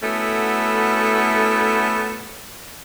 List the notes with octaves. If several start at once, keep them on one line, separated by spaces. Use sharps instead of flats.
A3 B3 C#4 E4 F#4 A4